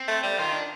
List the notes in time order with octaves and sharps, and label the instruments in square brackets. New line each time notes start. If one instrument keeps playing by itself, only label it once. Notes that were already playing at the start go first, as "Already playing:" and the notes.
Already playing: [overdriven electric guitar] C4
[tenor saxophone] A3
G3
[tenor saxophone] D#3 [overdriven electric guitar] F4
[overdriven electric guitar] D4